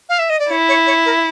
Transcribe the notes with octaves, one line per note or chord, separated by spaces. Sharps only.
F5
E5
D#5
D5
E4 C#5
C#5
C#5
A#4